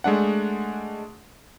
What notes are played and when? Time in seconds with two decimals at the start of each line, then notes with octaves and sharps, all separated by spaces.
0.04 G#3 A3 D4 F#5